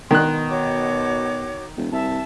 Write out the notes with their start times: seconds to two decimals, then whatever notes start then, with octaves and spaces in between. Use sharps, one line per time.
0.11 B2 D#3 C6 F#6
0.49 F#4 C#5 D6
1.77 E1
1.92 C2 E5 A5